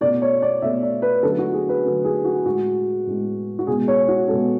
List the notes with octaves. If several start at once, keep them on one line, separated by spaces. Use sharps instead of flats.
B2 A3 D5
C#5
D5
B2 A3 E5
D5
B4
D3 F#3 A3 A4
F#4
G#4
B4
D3 F#3 A3
G#4
F#4
A2 G#3 F#4
A2 G#3
F#4
B2 G#3 G#4
C#5
F#4
B2 G#3 A4